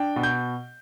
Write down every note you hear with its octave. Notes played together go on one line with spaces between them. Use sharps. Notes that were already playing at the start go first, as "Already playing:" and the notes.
Already playing: D4 G5
B2
G6